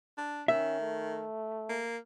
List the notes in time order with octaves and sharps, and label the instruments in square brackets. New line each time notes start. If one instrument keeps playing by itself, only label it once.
[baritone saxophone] D4
[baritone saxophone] D#3 [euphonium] C#4 [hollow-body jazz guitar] E5
[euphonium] A3
[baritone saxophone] A#3